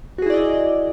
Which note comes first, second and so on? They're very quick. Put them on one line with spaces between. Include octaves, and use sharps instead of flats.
F#4 G#4 E4 D5 D#5